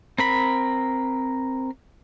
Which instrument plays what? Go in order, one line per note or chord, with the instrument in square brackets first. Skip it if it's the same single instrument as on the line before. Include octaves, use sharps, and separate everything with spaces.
[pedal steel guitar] C4 A#4 B5